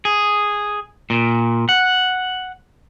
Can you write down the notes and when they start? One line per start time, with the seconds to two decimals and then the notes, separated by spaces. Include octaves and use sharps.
0.05 G#4
1.10 A#2
1.69 F#5